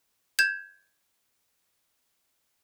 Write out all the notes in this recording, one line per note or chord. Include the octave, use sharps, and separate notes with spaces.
G6 G#6 E7